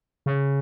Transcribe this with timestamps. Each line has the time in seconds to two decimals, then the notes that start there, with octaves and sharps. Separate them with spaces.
0.26 C#3